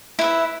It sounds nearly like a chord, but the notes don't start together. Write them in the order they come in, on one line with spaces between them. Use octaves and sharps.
E4 B4 E5